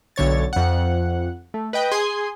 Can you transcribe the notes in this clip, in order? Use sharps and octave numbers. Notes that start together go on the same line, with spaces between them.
B1 D3 C#5 A6
F2 F#5
A3
B4 D#5 G5
G#4 G#5 C6